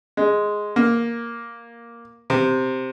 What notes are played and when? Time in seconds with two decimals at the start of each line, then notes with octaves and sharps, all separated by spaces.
0.17 G#3
0.76 A#3
2.30 C3